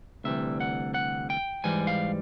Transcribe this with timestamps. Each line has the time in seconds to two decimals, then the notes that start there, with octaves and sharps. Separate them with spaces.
0.24 D2 C3 E3 G3 E5
0.60 F#5
0.94 F#5
1.30 G5
1.64 G#2 E3 G3 G#5
1.87 F5